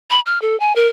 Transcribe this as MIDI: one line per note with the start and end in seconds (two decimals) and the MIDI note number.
0.10 0.20 83
0.26 0.40 89
0.42 0.58 69
0.60 0.73 80
0.76 0.87 70